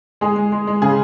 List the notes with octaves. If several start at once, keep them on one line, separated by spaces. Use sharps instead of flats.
G#3 G#4
G#3
G#3
G#3
C#3 G#4